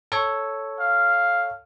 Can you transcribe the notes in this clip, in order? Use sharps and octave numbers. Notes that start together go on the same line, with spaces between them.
A4 C#5
F5